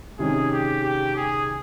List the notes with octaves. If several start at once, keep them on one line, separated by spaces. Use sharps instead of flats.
C3 D#3 G#3 C#4 G#4
G4
G4
G#4